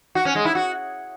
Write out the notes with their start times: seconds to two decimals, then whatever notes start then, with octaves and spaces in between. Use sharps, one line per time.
0.15 F#4
0.25 C#4
0.35 G#3
0.45 E4
0.55 F#4